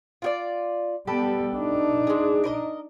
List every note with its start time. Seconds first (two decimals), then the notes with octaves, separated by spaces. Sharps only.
0.22 F4 F#4 D5
1.07 G3 B3 G4 A4 B4
1.56 D4 D#4
2.07 G#3 G#4
2.44 A#4 B4 D#5